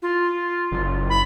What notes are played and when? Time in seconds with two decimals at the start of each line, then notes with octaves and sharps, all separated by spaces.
0.02 F4
0.72 F#1
1.10 B5